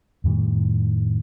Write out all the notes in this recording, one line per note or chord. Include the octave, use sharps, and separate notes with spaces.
F2 A2 D#3 G3